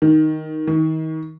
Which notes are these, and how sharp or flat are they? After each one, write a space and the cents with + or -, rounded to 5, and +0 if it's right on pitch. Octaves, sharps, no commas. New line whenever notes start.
D#3 +0
D#3 +30